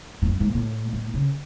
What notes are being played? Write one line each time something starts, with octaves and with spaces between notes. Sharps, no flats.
G#2
F#2
G#2
A2
A2
C#3